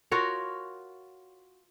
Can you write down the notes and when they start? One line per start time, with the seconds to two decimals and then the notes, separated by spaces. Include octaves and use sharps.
0.11 F4 F#4 A#4 C#5